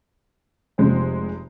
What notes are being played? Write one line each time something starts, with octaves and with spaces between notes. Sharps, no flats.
F1 C3 G#3 C4